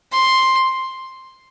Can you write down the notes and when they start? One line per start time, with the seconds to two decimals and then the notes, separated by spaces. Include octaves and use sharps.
0.12 C6